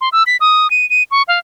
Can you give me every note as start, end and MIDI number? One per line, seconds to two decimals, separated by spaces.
0.01 0.09 84
0.12 0.23 88
0.27 0.37 95
0.41 0.70 87
0.71 0.88 99
0.90 1.03 99
1.11 1.23 85
1.28 1.39 77